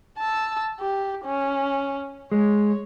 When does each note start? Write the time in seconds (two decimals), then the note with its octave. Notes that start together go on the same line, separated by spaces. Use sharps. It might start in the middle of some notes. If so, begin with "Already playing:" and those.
0.18 A5 E6
0.80 G4
1.25 C#4
2.32 G#3 C#5